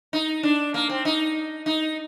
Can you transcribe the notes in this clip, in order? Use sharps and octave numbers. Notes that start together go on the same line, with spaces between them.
D#4
D4
A#3
C4
D#4
D#4